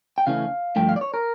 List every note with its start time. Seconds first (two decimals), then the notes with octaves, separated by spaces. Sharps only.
0.18 G5
0.27 C#3 E3 A3 C#4 F5
0.76 G2 D3 F3 A3 G5
0.89 F5
0.96 D5
1.01 C#5
1.14 A#4